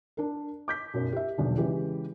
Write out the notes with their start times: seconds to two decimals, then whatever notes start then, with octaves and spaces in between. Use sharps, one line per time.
0.17 D4 A#4
0.68 D6 G6 B6
0.94 B1 F#2
1.12 G4 E5
1.38 D#1 B1 E2 D3
1.58 C#3 E3 G#3 G4